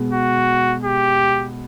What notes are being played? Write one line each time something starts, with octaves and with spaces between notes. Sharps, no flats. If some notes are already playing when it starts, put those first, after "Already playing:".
Already playing: B2 G#3 B3
F#4
G4